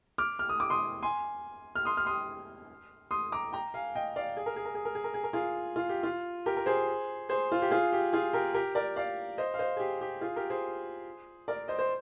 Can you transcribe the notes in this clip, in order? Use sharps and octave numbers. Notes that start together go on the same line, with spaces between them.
D6 F6
F6
D#6
D6
C6 D#6
G#5 C6
F6
C6 D#6
F6
C6 D#6
C6 D#6
A#5 D6
G5 A#5
F5 G#5
D#5 G5
D5 F5
G#4
A#4
G#4
A#4
G#4
A#4
G#4
A#4
G#4
A#4
F4 G#4
F4
G4
F4
G4 A#4
A#4
G#4 C5
G#4 C5
F4
G4
F4 G#4
G4
F4 G#4
G4 A#4
G4 A#4
A#4 D5
D5 F5
C5 D#5
F5
C5 D#5
G#4
G4
G4
F4 G#4
G4 A#4
G#4 C5
A#4 D5
C5 D#5
C5